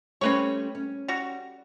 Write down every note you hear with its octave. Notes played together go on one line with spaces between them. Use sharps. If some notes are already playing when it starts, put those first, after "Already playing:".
G3 A3 C4 C#4 B4 C#5
C#4
G3 F#4